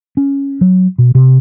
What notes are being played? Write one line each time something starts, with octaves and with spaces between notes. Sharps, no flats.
C#4
F#3
B2
C3